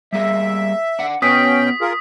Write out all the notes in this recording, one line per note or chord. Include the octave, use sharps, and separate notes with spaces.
G3 A#3 G#4 E5
D4 F#5
B3 C#4 F#4 B4 G5 D#6 B6
F4 G#4 A#4